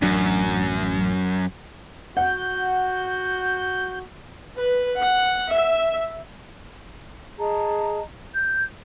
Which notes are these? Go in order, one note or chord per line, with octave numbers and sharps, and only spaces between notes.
A1 F#2 F#3 D4
F#4 F#5 G6
B4
F#5
E5
G#4 D#5 A5 A#5
G6